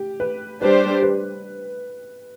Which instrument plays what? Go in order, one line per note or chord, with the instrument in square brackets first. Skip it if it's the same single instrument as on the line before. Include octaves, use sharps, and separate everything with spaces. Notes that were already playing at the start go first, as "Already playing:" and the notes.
Already playing: [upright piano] G4
B4
[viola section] G3 D4 G4 C5 [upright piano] B4
[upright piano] B4